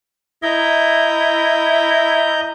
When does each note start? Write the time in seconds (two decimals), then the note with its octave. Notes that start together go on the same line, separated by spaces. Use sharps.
0.43 E4 D#5 A#5 G6